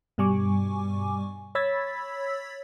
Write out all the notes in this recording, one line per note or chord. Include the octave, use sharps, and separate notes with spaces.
G2 B2 G3 G#5 C#6 D6
C#5 B5 E6 G#6 A6 B6